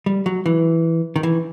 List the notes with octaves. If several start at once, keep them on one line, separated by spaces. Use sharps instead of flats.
G3
F#3
E3
D#3
E3